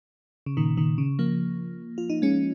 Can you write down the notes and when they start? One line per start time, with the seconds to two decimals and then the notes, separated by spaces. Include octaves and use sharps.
0.46 C#3
0.57 A#2 D#3
0.77 A#2 D#3
0.98 C#3
1.19 F3 A#3
1.98 F4
2.10 D#4
2.22 G#3 C#4